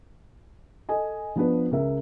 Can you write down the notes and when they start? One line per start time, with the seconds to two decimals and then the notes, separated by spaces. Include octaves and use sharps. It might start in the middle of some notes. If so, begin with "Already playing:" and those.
0.89 A4 D#5 G#5
1.36 F3 B3 D4 B4
1.72 C#2 A#4 E5